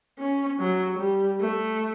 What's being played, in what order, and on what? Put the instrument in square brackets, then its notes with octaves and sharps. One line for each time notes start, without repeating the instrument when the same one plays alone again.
[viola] C#4
F#3
G3
A3